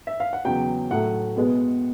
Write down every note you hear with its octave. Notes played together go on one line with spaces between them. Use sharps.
E5
F5
F#5
E2 C#3 F#3 G5
A2 F#3 A3 F#5
B2 G#3 B3